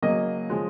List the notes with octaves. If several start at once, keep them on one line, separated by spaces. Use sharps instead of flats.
C#3 F#3 A#3 D#5
C#3 F3 G#3